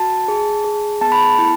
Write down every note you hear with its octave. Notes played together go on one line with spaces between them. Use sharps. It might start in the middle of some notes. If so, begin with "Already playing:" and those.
Already playing: F#4 A5
G#4
G#4
B3 A5
B5
A5
E4